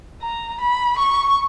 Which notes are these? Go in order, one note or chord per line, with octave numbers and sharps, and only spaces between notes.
A#5
B5
C#6